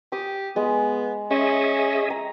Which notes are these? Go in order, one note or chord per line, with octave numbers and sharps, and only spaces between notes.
G4 D#6
G#3 B3
C#4 G#4 D#5 E5
A#5